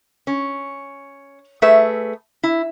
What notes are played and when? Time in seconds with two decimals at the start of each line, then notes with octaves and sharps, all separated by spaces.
0.27 C#4
1.62 A3 G#4 B4 E5
2.43 E4